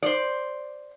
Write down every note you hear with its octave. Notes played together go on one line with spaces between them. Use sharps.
C5 D5